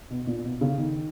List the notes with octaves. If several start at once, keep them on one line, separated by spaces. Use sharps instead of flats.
B2
A#2
B2
C#3
D#3